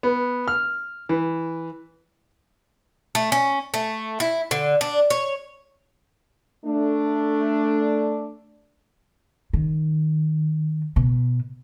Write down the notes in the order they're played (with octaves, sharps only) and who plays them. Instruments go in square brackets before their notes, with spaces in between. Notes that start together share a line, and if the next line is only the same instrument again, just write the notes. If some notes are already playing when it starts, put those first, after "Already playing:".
[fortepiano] B3
F6
E3
[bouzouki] A3
C#4
A3
E4
D3
D4
C#5
[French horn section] A3 D4
[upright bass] D#3
B2